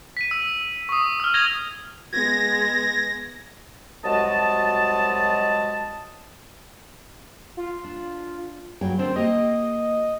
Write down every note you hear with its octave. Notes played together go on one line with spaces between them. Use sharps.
B6 D#7
E6
C#6 D#6
E6 F6
G#6 A#6 D#7 F7 G7
G#3 B3 G#6 A#6
C2 F#3 G#3 F#4 D#5 A5
F4
D4
G2 F#3 G#4 G5
D#3 C4 D4 C5
A#3 G4 D#5 G5